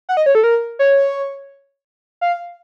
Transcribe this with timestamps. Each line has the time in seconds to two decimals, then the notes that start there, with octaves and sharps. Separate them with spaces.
0.09 F#5
0.17 D#5
0.26 C#5
0.35 A4
0.44 A#4
0.79 C#5
2.21 F5